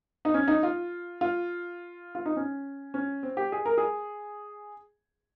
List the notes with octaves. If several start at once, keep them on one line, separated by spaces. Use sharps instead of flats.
D#4
C#4
D#4
F4
F4
F4
D#4
C#4
C#4
C4
G4
G#4
A#4
G#4